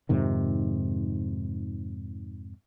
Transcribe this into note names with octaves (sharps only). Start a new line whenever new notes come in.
F2 G#2 C3 D#3